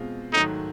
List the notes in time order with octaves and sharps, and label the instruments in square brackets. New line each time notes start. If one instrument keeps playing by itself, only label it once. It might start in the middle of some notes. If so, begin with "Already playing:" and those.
Already playing: [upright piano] B2 G#3 C4 F4
[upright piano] G#2 D#3 F#3 A3 [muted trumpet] D#4